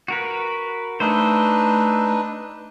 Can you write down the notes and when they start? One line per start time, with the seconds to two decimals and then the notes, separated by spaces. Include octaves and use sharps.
0.08 F#4 A#4 B4
1.00 A3 D4 D#4 B4 C5